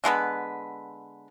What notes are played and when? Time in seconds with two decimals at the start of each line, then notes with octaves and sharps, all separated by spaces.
0.04 D3 G#3 B3 B4